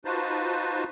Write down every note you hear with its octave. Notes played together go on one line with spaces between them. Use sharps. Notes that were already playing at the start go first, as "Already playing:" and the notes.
D#4 F4 F#4 B4 C5 A5